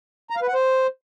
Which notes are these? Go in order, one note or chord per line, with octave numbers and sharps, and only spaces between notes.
A#5
F5
B4
F#5
C5